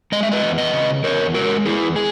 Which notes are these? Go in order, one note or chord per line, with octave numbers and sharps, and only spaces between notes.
G#3 D#5
E5
B4 D#5
E2
B4 D#5
C#3
E2 A#4 C#5
G#3 F#4 A#4
E2 E4 G#4
G#3 G#4